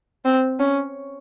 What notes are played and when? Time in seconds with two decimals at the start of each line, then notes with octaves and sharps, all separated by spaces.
0.25 C4
0.60 C#4